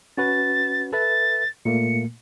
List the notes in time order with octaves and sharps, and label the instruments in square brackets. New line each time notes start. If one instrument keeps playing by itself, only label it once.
[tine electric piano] C#4 F#4 B4 [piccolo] A6
[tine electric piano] A4 B4 E5 [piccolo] A6
[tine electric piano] A#2 A3 A#3 [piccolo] C#7